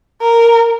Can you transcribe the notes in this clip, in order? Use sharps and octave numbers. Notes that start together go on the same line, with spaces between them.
A#4